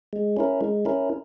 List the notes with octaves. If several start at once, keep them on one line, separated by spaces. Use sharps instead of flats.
G#3
C#4 E4 A#4
G#3
C#4 E4 A#4